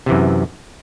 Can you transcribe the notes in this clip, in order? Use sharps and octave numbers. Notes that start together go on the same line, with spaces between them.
F#2 C3 E3